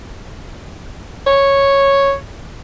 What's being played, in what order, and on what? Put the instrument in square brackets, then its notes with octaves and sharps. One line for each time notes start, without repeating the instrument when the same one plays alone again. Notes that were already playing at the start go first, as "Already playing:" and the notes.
[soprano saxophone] C#5